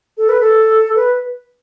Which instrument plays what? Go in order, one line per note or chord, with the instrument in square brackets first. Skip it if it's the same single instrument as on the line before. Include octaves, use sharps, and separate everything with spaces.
[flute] A4
B4
A4
B4